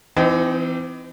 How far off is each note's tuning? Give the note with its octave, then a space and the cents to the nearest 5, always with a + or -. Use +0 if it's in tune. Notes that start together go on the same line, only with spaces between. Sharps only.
E3 +25 C4 -25 D#4 +0